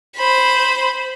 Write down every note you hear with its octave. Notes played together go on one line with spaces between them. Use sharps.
C5 B5